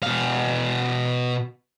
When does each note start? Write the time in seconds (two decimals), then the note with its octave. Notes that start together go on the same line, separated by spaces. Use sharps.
0.03 B2 F5